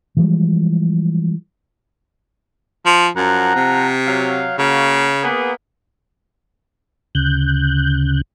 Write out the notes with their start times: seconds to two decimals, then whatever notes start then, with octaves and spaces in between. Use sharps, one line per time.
0.17 E3 F3 G3 G#3
2.86 F3
3.16 F#2 F3 F#5 A#5
3.55 C3
4.07 F#3 F5
4.58 C#3 A#3 F#4
5.23 A#3 B3 G#4
7.15 D2 C#3 F#6 G6